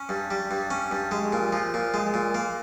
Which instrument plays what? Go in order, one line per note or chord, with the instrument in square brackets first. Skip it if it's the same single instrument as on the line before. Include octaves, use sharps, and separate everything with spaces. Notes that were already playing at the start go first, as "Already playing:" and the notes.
Already playing: [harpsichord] C#4
G2
G3
G2
C#4
G2
G#3
A#2
F3
A#2
G#3
A#2
A#3